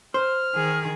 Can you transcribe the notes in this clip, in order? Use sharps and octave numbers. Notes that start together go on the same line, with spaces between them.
C5 F6
D#3 G#4